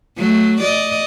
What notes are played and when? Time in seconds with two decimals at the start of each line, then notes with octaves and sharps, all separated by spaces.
0.18 F#3 A3
0.61 D5 D#5